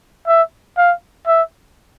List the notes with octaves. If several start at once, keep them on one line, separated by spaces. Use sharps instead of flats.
E5
F5
E5